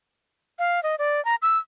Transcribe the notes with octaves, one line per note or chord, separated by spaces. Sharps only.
F5
D#5
D5
A#5
E6